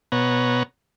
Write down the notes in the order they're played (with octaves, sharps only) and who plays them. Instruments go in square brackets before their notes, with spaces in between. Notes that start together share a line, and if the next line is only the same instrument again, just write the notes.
[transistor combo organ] B2 B3 C#5 F#5 A#5